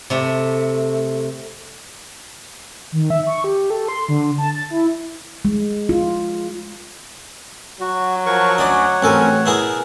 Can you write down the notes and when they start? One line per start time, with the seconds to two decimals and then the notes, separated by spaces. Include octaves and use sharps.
0.10 C3 A3
2.92 D#3
3.10 E5
3.27 C#6
3.44 G4
3.70 A4
3.88 C6
4.09 D3
4.38 A5
4.55 A6
4.71 E4
5.45 G#3
5.89 F4
7.81 F#3 F#4
8.26 F3 A#4 C#5 F#5 C#6
8.58 D2 C#4 D#4 D5
9.02 A1 C4 C#4 A4 A#4 G#5
9.46 B2 B3 E4 G#4 A#4